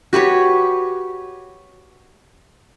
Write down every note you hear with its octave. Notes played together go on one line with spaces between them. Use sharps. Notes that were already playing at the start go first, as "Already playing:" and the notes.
F#4 G4 B4 C#5